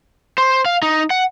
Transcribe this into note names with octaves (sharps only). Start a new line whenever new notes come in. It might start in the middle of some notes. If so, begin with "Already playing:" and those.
C5
F5
D#4
F#5